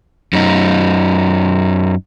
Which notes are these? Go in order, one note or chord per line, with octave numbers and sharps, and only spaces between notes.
F#2 D#4